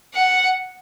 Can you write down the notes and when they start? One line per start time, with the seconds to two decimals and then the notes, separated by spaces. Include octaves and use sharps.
0.14 F#5